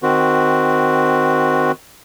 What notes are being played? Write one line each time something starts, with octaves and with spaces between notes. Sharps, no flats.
D#3 C4 F#4